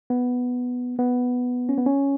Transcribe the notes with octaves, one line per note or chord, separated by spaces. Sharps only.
B3
B3
C#4
B3
C#4